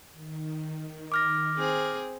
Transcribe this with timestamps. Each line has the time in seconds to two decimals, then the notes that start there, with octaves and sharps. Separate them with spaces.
0.12 D#3
1.12 D6 F6 A#6
1.57 C4 G#4